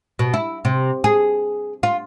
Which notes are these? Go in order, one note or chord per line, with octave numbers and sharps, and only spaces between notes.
B2
E4
C3
G#4
F4